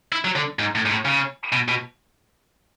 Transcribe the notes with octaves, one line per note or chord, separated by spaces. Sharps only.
E4
F#3
D3
G#2
A2
G#2
A2
C#3
B2
B2